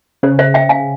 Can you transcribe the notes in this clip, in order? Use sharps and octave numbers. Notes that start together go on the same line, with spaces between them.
C#3 C5
C5 E5
E5 G5
F5 G#5